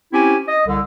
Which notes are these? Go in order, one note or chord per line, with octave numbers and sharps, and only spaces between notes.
C4 C#4 E4 G4 G#5
D#5
C2 D3